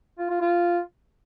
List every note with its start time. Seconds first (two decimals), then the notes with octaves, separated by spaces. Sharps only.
0.18 F4
0.30 F4
0.41 F4